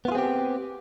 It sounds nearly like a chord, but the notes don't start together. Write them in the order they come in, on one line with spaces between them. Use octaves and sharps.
B3 F4 G#4 C4 G4